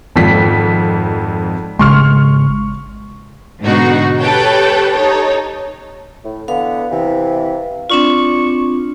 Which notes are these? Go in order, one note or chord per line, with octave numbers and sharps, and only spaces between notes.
G#1 F2 B6
G#1 C#3 G#3 C6 C#6 F6
G#2 B2 D3 D#4 F#4
G4 A4 B4 C#5 G5 A5
D#4 G4 A4 C#5
A2
D3 E3 B3 F5
C3 E3
C4 D4 F4 D5 C#6